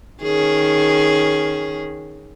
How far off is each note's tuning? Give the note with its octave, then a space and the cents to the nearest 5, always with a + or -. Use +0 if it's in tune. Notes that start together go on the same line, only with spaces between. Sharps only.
D#3 +0 C#4 +0 G#4 +0